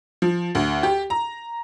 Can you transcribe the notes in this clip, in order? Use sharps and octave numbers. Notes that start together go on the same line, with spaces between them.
F3
D2
G4
A#5